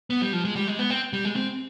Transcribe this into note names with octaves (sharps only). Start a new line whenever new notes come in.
B3
G3
F3
G#3
G3
G#3
B3
C4
G3
G#3
C4